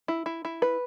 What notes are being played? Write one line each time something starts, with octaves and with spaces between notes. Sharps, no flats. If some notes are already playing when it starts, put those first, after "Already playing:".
E4
E4
E4
B4